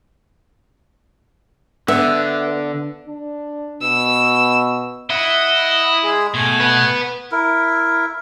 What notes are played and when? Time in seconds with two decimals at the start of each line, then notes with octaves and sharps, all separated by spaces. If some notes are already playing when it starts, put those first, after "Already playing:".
1.88 D3 B3 E5
3.07 D4
3.82 B2 E6
5.10 E4 D#5 E5 F#5
6.04 G#3 G#4
6.34 B2 A3 G#5
6.60 B4 F#5
7.32 E4 A#4